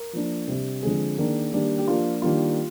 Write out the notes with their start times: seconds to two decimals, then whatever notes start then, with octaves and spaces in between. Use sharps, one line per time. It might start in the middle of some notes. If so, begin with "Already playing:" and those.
Already playing: A#4
0.13 F3 A#3 D4
0.48 C3 G3 D4
0.83 D3 F3 G#3 C4 G#4
1.18 D#3 A#3 D4
1.53 D#3 G3 A#3 D4
1.79 G4
1.87 F3 A#3 D4 F4
2.22 D#3 G3 A#3 D4 F4